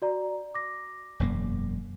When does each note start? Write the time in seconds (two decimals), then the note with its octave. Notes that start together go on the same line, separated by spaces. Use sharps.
0.02 F#4 D5 A#5
0.55 D6 A#6
1.20 E1 F#2 A#3